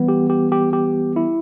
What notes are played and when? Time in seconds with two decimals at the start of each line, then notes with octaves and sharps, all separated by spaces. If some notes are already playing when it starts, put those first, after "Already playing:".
Already playing: E3 G3 B3
0.08 G4
0.30 G4
0.52 G4
0.73 G4
1.16 E4